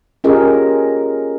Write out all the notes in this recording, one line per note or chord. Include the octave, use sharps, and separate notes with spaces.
C#4 F4 G4 G#4 A#4 D#5